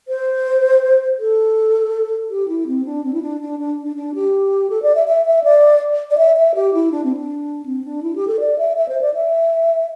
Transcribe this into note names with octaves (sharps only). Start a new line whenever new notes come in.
C5
A4
G4
E4
C4
D4
C4
E4
D4
D4
D4
D4
D4
G4
A4
D5
E5
E5
E5
D5
D5
E5
E5
G4
E4
D4
C4
D4
C4
D4
E4
G4
A4
D5
E5
E5
C5
D5
E5